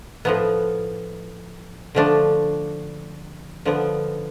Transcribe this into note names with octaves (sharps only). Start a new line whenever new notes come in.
A2 F3 B3
D3 F3 A3 D4
D3 F3 B3